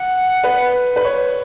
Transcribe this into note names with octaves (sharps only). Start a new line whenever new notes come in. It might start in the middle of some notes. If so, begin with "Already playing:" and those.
Already playing: F#5
B4
B4
C#5